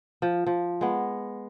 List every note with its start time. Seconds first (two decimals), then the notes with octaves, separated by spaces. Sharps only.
0.22 F3
0.46 F3
0.81 G#3 B3